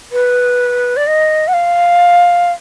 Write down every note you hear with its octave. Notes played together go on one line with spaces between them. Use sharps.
B4
D5
D#5
F#5
F5